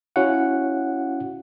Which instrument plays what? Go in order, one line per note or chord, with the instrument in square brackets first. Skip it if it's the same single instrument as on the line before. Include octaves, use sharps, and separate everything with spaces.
[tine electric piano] C#4 E4 F#4 C#5 F5 F#5